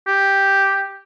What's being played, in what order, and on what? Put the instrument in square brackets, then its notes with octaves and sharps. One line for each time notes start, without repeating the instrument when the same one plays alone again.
[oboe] G4